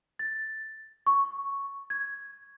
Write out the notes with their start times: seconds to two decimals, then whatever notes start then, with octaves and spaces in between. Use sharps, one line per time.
0.19 A6
1.07 C#6
1.90 G#6